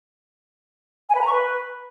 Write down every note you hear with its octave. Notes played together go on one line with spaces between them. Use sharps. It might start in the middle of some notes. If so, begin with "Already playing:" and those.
G#5
B4
A#5
C#6
B4